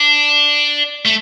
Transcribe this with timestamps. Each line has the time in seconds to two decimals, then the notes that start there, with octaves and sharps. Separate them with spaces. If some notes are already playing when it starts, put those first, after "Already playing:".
Already playing: D4
1.05 A3